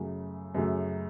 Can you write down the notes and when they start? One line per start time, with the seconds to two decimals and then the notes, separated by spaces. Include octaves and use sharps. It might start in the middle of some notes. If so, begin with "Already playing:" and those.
Already playing: F#2 C#3 F#3 A3
0.55 F#2 C#3 F#3 A3